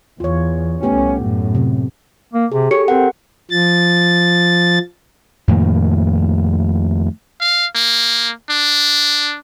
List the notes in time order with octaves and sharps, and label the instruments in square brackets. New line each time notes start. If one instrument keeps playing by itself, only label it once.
[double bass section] E2 [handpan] F4 C#5
[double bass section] C2 C#4 [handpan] A3 B3 G4
[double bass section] F#2 A2
[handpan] C3
[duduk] A#3
[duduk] C3 [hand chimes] G#4
[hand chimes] G4 A4 C#7 [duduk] C#5
[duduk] C4 [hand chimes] A#4 F#5
[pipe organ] F3 A6
[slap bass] F2 A2 D#3 A#3
[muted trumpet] F5
A#3
D4